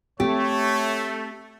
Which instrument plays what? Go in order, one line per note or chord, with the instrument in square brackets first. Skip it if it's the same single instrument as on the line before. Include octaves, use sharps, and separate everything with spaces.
[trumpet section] A3 [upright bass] C4 [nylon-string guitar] G4 [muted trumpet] C#5